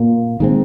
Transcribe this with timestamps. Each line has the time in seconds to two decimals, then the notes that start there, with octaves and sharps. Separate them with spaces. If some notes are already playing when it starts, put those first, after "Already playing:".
Already playing: A#2 A#3
0.40 D#3 G#3 C4